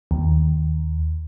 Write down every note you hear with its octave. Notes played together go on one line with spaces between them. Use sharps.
D#2